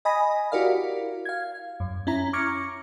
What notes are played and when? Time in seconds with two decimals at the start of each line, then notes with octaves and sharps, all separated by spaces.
0.05 D#5 G#5 B5 D#6 A#6
0.52 E4 F#4 G4 A#4 D5 F5
1.25 F5 G#6
1.80 F#2
2.07 C#4 E4 A#5
2.33 C#6 D6 F6 G#6 A#6 C#7